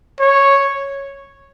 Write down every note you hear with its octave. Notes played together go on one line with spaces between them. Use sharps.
C#5